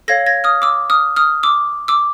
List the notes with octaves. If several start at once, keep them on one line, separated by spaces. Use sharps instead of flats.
A4 C#5 F5 G#6 A#6
G#6 A#6
D#6 F6
D6 E6
D#6 F6
D#6 F6
D6 E6
D6 E6